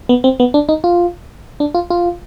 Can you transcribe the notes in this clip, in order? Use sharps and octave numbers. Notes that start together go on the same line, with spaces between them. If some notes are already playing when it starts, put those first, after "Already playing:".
B3
C4
B3
D4
D#4
F4
D4
F4
F4